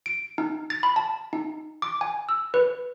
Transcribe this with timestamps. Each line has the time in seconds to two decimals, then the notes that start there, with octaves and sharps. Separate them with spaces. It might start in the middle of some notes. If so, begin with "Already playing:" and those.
0.06 D7
0.38 D#4
0.70 A6
0.83 B5
0.96 A5
1.33 D#4
1.82 D6
2.01 G#5
2.29 E6
2.54 B4